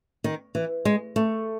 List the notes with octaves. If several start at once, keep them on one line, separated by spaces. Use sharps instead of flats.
D#3
E3
G#3
A3